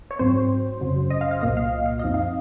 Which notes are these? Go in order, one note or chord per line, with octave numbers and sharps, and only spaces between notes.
C#5
G#2 F#3 C4 C5
F#2 C#3 F#3
D#5
F5
F5
C2 A#2 F#3 A#3 F4 D#5
F5
F5
F#2 F3 C4 D#4 D#5
F5